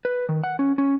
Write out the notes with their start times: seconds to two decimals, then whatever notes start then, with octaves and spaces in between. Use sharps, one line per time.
0.05 B4
0.29 D#3
0.44 F#5
0.59 C#4
0.78 C#4